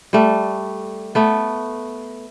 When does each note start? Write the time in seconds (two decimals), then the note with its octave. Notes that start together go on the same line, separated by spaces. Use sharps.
0.13 G3 A3
1.15 A3 B3